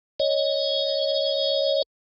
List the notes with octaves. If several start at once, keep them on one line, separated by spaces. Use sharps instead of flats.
C#5 D#5